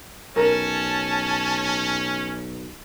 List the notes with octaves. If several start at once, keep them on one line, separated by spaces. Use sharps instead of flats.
B1 C#4 A#4 A5